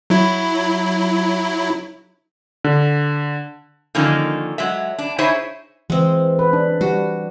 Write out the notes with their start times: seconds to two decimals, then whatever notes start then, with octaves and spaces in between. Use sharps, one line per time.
0.10 F#3 E4
2.64 D3
3.95 D3 D#3 F3 A#3 C#4 D#4
4.58 F#3 G#3 E5
4.98 D4
5.18 D#4 E4 G#4 C5 C#5 E5
5.90 E3 G#3 C4
6.39 B4
6.53 D4
6.81 G3 F#4